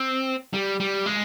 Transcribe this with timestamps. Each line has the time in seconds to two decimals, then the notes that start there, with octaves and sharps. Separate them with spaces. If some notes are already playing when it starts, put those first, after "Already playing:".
Already playing: C4
0.54 G3
0.80 G3
1.06 G#3